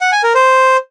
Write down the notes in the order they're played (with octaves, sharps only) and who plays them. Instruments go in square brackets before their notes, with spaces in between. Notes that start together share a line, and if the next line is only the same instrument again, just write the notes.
[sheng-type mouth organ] F#5
G#5
A#4
C5